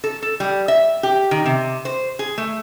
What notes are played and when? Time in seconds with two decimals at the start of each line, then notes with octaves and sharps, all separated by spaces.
0.04 A4
0.22 A4
0.40 G3
0.68 E5
1.03 G4
1.31 D#3
1.46 C3
1.85 C5
2.19 G#4
2.38 A3